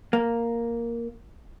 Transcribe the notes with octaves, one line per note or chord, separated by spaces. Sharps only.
A#3